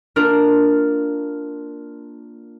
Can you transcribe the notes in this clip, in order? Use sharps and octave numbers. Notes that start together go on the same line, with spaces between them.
A#3 D4 F4 A#4